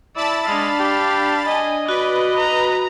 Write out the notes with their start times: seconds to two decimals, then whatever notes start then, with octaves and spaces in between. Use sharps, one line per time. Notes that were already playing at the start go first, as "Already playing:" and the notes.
0.16 E4 D5 A5 B5 E6 A6
0.48 G#3 D4 D5 F5
0.79 G4
1.47 D#5 G#5
1.89 F#4 B4 D5
2.38 A#5